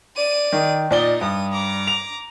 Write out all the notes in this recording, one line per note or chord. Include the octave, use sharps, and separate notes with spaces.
D5 D#7
D#3
A#2 D#4 D5 D#5 G7
G2 D#6
A#5 D6
F7